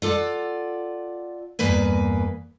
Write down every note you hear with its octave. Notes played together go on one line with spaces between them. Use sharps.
F4 A4 D5 F#5
E2 G2 A#3 B4 G#5